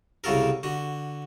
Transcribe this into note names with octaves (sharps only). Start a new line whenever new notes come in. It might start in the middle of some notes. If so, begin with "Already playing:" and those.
C2 C#3 F#4 A4 A#4
D3 F#4